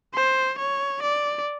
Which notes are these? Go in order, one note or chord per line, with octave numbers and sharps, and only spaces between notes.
C5
C#5
D5